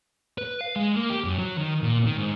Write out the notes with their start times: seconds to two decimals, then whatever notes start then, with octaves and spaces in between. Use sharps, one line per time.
0.38 B4
0.61 F5
0.76 G#3
0.96 A#3
1.10 G4
1.25 F#2
1.38 F#3
1.58 D#3
1.83 A#2
2.06 D#3
2.17 G#2